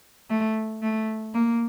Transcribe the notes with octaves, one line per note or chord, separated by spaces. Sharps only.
A3
A3
A#3